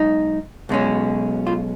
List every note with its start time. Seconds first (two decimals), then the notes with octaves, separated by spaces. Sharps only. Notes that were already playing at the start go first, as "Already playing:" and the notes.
Already playing: B1 G#3 D#4
0.69 B1 B2 G#3 C#4
1.47 F4